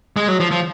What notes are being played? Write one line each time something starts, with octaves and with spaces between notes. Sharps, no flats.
G#3
F#3
F3
F3